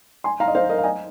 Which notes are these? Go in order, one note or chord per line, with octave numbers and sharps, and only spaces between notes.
G#5 C6
F5 A#5
D#5
C5 F5
A#4 D#5
F5
D#5 G#5